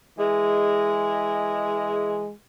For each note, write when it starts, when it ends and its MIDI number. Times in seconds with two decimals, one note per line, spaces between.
0.17 2.31 52
0.17 2.31 56